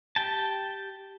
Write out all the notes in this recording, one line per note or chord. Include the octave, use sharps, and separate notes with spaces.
G4 G5 A5